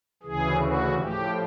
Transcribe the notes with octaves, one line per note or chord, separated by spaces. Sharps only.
D2 C#3 E3 G#4
F#4
A2 F3 G4